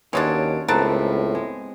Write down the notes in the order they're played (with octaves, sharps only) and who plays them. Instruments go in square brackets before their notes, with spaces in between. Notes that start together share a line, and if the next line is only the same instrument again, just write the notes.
[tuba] D#2 [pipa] B2 G#3 D4 [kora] C#4
[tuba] C#2 [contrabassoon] A2 [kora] B3 C4 [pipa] A#4 F#5 A5
[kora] G#3